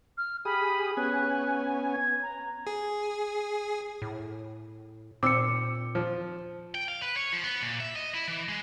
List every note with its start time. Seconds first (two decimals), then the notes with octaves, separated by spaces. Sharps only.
0.18 F6
0.45 G4 G#4 B5 D#6
0.97 B3 C#4 G#5 F#6
1.93 G#6
2.22 A#5
2.67 G#4
4.02 A2
5.23 A#2 C4 D6 E6 C#7
5.95 F3
6.75 G5
6.88 F5
7.02 B4
7.16 C#5
7.33 F3
7.44 B3
7.62 A#2
7.80 E5
7.96 D#5
8.14 E4
8.28 E3
8.48 G#3